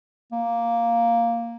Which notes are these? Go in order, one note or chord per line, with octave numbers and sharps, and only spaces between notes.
A#3